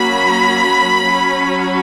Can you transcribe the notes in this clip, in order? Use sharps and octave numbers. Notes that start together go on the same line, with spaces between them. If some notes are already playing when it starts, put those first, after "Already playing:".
Already playing: F#3 A#3 C#4 B5
F#3 C#4